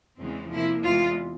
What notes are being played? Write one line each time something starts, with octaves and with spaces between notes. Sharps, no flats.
E2 C#3 E3 G#3 C4
C3 F3 A#3 E4
E2 C3 E3 G#3 F4